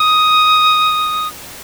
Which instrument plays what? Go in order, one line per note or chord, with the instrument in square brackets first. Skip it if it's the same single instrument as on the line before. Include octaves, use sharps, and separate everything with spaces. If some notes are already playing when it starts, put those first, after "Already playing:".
Already playing: [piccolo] D#6